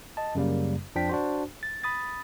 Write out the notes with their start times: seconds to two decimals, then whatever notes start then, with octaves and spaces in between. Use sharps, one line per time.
0.17 D#5 A5
0.35 F#2 C#3 G3 A#3
0.95 F2 F3 D4 G5 B6
1.09 D4 F#4 C5
1.63 A6
1.84 B5 D#6 A6